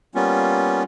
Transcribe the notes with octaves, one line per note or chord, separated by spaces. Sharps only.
G3 A#3 B3 C#4 F4